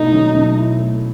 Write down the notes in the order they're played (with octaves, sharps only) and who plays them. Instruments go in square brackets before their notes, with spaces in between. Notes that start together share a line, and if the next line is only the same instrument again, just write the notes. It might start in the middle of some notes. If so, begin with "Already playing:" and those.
Already playing: [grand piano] B2 A3 E4 [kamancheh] D#4
[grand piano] F#3
B2
E4
A3